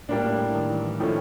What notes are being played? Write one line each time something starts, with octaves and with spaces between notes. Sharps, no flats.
A2 G3 A#3 D4
A2
A2
D#3
E3
E3
A2 D#3 F3 A3 C#4